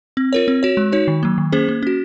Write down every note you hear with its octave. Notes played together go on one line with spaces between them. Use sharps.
C4
F4 A#4 C#5
C4
F#4 C#5
G#3
D#4 F#4 C#5
D#3
F#3 A#3
D#3
A#3 C#4 G#4 C5
A#3
C#4 F#4